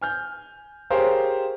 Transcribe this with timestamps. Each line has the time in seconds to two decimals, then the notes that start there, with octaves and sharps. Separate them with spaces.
0.01 G#5 F6 G6
0.90 G4 G#4 A#4 C5 C#5 F5